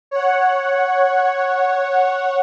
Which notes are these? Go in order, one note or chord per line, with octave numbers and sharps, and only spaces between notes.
C#5 F#5